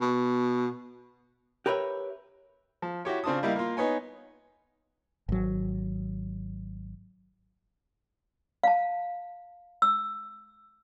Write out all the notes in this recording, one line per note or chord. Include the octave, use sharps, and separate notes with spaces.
B2
G4 A#4 B4 C#5 E5
F3
E4 F#4 G4 C#5
C#3 C4 D4 F4 A5 D#6
G3 A#3 E4 D#5 F5
A#3 F4
B3 D#4 C#5 G#5
G#1 F#3
F5 A5
E6